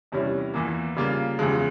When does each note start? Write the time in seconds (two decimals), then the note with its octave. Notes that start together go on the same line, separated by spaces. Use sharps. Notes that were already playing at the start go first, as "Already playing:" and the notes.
0.12 E2 C3 G3 C#4 E4
0.54 E2 E3 A#3
0.97 C#3 G3 A#3 F4
1.39 E2 C#3 F3 G#3